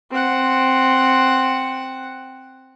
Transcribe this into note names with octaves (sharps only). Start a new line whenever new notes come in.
C4 F#5